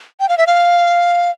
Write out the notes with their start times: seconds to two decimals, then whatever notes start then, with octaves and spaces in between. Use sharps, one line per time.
0.20 G5
0.29 F5
0.38 E5
0.47 F5